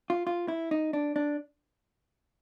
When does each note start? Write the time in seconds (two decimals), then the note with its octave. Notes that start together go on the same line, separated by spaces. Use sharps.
0.10 F4
0.27 F4
0.48 E4
0.71 D#4
0.93 D4
1.16 D4